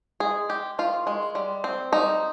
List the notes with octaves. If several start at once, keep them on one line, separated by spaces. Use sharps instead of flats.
G#3 G#4
G#3 G4
D#3 F4
G#3
G3
C4
G3 D#4